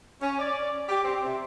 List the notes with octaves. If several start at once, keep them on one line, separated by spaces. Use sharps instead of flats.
C#4
D5
G4
C4
C3